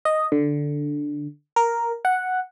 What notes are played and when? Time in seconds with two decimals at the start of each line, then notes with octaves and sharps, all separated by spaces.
0.05 D#5
0.32 D3
1.56 A#4
2.05 F#5